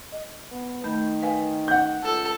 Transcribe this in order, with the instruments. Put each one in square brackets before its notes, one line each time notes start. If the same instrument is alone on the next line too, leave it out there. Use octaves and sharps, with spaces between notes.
[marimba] D#5
[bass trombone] B3
[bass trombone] D#3 [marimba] A3 B5 G6
[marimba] B4 F5 G#5
[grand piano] F#5 G6
[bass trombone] C#2 [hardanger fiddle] A4